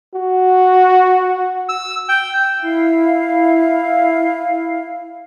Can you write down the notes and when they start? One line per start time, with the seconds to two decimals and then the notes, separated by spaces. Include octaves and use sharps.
0.14 F#4
1.69 E6
2.09 G5
2.60 E4 F5